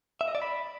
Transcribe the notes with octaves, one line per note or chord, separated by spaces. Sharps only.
E5
D#5
D5
B5